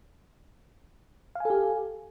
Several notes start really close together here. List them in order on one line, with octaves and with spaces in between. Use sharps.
F5 G#5 A4 G4